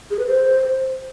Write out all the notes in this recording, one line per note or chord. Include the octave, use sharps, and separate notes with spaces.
G#4
B4
C5